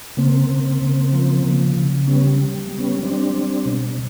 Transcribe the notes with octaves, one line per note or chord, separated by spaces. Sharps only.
C#3 A#3 C4
C#3
C#3
F3
C#3
C#3
G3 B3 C#4
G3
G3
B3 C#4
G3 C4 D4
G3
B2